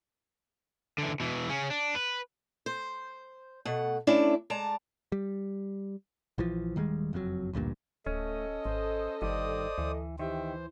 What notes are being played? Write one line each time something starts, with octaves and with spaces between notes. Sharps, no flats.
D3 E3
B2 E3
C#3 C#4
D4
B4
C5
B2 A3 F#5
A3 C#4 D4 E4 D5
G#3 D5 A5 A#5
G3
A#1 E3 F3
D#1 D#3 G3 G#3
F#1 F2 B2 F#3
A1 D2 G2 A#2
D1 A3 C#4 A4 D#5
G#1 C5
G1 G2 D#3 C5 D5 D#6
D2 E3
D#3 E3 G4 C5 E5 G5